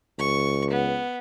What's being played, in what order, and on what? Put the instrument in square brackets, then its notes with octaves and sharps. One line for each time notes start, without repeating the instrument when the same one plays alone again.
[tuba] C#2 [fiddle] C#6
[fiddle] B3